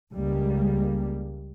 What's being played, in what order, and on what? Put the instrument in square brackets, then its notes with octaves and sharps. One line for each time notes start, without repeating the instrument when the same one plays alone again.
[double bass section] C#2 G3 G#3 A#3